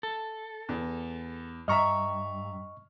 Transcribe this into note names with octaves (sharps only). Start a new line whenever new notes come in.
A4
E2
G2 D#5 E5 A#5 C#6 F6